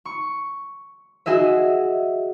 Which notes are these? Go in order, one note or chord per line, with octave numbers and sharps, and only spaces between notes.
C#6
F#4 G#4 D#5 E5